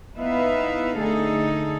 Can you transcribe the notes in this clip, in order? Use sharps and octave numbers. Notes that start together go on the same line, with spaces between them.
B3 D#4 E4 B4 E5 F5
D3 A3 D#4 G#4 A4